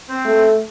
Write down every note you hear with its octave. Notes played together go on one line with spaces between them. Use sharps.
C4 C5
A3